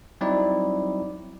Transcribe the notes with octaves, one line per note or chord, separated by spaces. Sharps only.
F#3 G3 C4 D#4 E4 D5